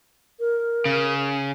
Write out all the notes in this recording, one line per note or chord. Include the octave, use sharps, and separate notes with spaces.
A#4
C#3